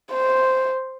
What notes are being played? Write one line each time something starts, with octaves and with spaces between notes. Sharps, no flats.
C5